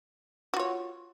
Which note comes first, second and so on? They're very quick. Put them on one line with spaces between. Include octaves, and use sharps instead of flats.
F#4 F4 C#5